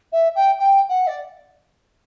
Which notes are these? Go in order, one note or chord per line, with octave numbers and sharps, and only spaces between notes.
E5
G5
G5
F#5
D5